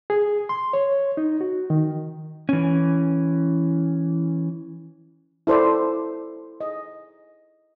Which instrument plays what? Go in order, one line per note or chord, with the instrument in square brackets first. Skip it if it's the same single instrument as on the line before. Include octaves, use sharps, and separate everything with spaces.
[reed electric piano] G#4
C6
C#5
D#4
F#4
D#3
[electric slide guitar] E3 C#4
[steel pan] E4 A4 C5 D5
D#5